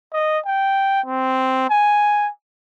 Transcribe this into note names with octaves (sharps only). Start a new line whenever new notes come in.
D#5
G5
C4
G#5